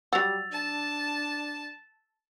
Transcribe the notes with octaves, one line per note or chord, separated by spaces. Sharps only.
F#3 G3 F#4 E6 A6 F7
D4 A5